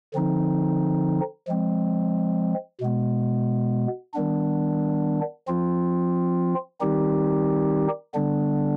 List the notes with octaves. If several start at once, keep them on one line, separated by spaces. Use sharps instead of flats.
D3 F3 C4 D#4
F3 G#3 C4
B2 G#3 B3
D#3 G3 B3 D4
F3 C4 F4
D#3 G3 C4 D#4 G4
D3 G3 B3 D4